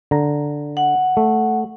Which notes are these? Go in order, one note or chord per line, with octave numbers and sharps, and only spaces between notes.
D3 A#5
F#5
A3